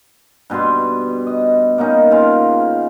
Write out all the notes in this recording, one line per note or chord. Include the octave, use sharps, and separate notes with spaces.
G2 B2 B4 C6
D#5
A#3 B3 C#4 D#4
C#3 F4 F5